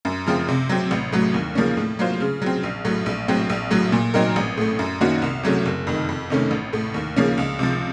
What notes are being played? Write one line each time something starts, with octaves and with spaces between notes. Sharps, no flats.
F#2
C#3 F3 C4
C3
F#3 C4
A1
A2 F#3
D#2
C#3 F3 A#3 C#4
A2
F#3 A#3 F4 C5
C#3
F#3 C4
A#1
A2 F#3 A3
A#1
A2 F#3 C4
A#1
A2 F#3
A#2
F#3 C4 D#4 A#4
A1
A2 A3
F#2
D#3 A#3 C#4 F#4
C2
C3 F#3 A3 C#4
F#1
F2 D#3
F2
C3 D#3 A3 C#4
A1
A2 A3
D#2
C#3 F3 A#3 C#4
C#2
C3 F3